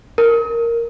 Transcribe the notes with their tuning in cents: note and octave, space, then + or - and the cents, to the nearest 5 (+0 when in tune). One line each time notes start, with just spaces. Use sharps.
A#4 -5